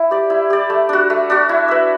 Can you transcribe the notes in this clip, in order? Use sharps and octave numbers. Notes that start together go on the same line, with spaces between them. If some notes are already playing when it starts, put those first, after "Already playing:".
Already playing: E4
G4 D5
E4
G4 D5
A3
D4 F#4
A3
D4 F#4
E4
B4 E5